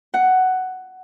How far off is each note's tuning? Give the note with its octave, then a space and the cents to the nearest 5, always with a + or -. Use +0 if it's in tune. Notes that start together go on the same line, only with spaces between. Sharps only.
F#5 +10